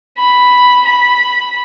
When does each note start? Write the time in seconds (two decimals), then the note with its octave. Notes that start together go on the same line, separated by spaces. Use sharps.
0.18 B5
0.86 B5